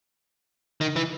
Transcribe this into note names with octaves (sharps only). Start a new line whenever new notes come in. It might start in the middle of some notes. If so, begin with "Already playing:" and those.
D#3
E3